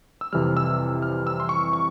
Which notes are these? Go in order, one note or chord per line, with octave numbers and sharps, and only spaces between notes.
E6
F2 C3 E3 G3 F6
E6
F6
E6
C6
C#6
C#6